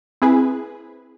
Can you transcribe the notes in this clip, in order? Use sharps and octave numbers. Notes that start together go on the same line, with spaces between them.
C4 E4 G#4 B4